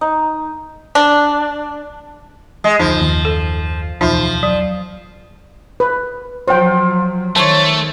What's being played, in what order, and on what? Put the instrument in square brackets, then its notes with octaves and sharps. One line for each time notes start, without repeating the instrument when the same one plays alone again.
[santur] D#4
[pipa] D4
[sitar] G#3
[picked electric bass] F1 D2 [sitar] F3 [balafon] D#4 C5
[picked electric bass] F#1 D#2 D#3
[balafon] A4
[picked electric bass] D1 B1 E2 [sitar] F3 [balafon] D#4 F4 E5
[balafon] F#3
[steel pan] B4
[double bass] F3 F#3 [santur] F4 [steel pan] C5 C#5 G5
[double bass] D#3 [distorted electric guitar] A3 [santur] C5 C#5 [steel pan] A5